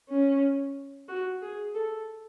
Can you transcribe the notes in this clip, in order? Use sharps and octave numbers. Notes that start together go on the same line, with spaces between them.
C#4
F#4
G#4
A4